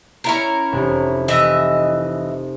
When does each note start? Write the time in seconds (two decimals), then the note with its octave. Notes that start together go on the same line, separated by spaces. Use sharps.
0.24 C#4 E4 A#4
0.72 F1
1.28 E3 D#5 E5